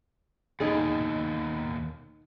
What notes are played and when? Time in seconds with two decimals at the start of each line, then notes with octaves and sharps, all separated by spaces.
0.60 D#2 B2 D#4 G#4